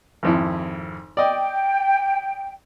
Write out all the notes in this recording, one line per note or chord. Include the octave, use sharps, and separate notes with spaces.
G#1 F2 E4
D5 D#5 G5